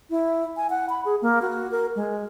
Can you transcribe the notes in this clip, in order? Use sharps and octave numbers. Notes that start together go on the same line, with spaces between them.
E4
G#5
F#5
B5
G#4
A#3
F#4
A#4
G#3